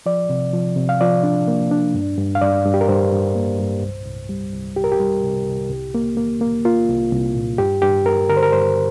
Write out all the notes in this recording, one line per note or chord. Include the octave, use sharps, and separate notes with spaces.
F3 D5
C3
F3
C3
F5
F3 D5
D4
A#3
D4
G2
G2
F5
G2 D5
G2
G4
A#4
G2 C5
G2
A#3
G2
C2
C2
G3
C2
C2 G4
A#4
G4
G3
C3
C2
C2
A#3
A#3
A#3
A#3 F4
C2
C2
A#2
G2 G4
G2 G4
G2 A#4
D3 A#4
C5
A#4
G2 C5